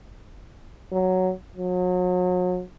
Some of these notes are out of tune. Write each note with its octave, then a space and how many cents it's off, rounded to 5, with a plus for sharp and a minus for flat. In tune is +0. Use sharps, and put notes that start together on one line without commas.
F#3 +5
F#3 -35